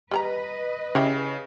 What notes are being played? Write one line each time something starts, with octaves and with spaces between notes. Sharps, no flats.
G3 G#4 B4 D#5 A#5
C#3 E4 G4 G#4